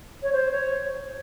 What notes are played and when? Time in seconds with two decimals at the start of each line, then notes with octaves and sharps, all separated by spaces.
0.23 C#5
0.33 C5
0.51 C#5